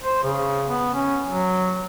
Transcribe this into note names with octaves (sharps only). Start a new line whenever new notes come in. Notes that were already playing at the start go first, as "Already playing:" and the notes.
C5
C#3
B3
C#4
F#3